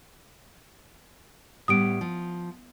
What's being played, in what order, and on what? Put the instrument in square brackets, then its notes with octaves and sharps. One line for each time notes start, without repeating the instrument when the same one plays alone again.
[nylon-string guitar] A2 G3 B3 [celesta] D#6 D7
[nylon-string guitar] F3